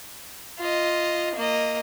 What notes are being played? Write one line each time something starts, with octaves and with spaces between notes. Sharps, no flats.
F4 D#5
A#3 D#5